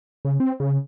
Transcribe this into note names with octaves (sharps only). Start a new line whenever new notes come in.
C#3
C4
C#3